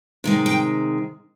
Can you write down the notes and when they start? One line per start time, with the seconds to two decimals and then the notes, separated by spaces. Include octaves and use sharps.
0.24 C3 D#3 G#3
0.46 G5